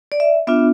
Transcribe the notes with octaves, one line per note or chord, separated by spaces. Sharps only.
D5
E5
B3 D4 F4 E5